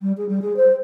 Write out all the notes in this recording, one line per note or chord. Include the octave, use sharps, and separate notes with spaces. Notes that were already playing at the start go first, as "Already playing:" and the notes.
G3
G#4
G3
G#4
C5